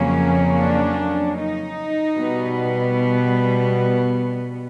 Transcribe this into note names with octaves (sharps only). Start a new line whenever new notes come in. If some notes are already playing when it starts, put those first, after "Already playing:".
Already playing: F2 C#3 F#3 A#3 C#4
D4
D#4
B2 G3 B3